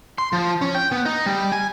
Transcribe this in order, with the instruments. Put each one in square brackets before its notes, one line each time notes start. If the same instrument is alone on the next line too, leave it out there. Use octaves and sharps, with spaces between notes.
[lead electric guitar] C6
F3
C#4
G5
B3
D#4
G3
G#5